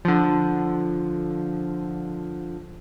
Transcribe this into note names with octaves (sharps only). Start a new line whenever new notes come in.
D3 F3